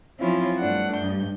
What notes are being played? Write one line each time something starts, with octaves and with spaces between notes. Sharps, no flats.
F3 F#3 C4 C#4 E4 F4
G2 A3 D4 F#5
G2 G6